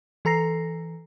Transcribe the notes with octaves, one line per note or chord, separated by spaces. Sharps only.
E3 A4 A#5 A#6 C7